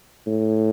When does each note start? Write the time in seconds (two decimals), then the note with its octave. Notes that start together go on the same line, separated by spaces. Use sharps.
0.27 A2